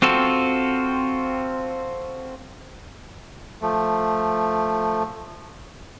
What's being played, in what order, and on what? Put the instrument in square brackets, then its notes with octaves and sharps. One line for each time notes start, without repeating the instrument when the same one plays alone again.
[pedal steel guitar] C4 F4 F#4 A4
[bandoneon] F3 A3